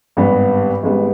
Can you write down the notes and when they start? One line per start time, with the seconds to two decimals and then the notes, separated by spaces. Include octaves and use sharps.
0.17 G#1 G2 G3 B3
0.83 G#1 G#2 G3 B3